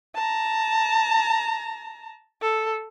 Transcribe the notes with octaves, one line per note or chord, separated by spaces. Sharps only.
A5 A#5
A4